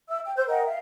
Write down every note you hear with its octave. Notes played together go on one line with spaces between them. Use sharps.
E5 E6
G5
C5 E6 G6
A#4 D#5 F#5 G5
E5 F5